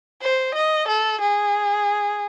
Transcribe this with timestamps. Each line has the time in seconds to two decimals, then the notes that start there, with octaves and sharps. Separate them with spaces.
0.22 C5
0.55 D#5
0.88 A4
1.20 G#4